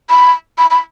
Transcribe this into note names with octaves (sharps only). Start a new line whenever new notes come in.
B5
B5
B5